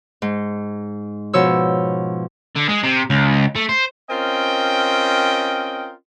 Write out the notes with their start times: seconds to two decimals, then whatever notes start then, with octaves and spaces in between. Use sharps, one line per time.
0.22 G#2
1.33 B2 F3 C#5 E6
2.56 D3
2.69 G#3
2.83 C3
3.10 C#2
3.56 A3
3.69 C5
4.10 C4 C#4 F4 A#4 D#5 G5